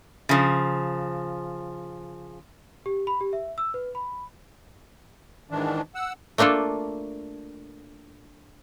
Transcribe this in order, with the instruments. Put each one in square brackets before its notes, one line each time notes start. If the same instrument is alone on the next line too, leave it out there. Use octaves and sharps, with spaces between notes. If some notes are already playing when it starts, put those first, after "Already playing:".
[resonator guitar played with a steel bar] C#3 F3
[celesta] G4
B5
G4
E5
E6
B4
B5
[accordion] G#2 D#3 E3 D4
F#5 E6
[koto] A3 A#3 D4 F4 A4